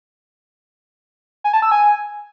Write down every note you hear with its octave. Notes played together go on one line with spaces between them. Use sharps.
G#5
A5
E6
G#5